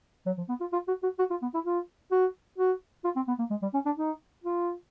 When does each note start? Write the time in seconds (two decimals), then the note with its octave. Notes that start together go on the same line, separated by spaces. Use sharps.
0.26 F#3
0.37 F3
0.49 B3
0.61 F4
0.73 F4
0.88 F#4
1.03 F#4
1.19 F#4
1.30 F4
1.42 B3
1.54 E4
1.65 F4
2.12 F#4
2.58 F#4
3.04 F4
3.16 C4
3.28 B3
3.39 A#3
3.51 G#3
3.62 G3
3.74 C#4
3.86 D4
3.97 D#4
4.44 F4